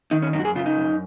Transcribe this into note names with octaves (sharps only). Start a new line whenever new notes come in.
D#3 D#4
C#4
F#2 D#4
F#4
G#4
C#3 F4
D#4
F#2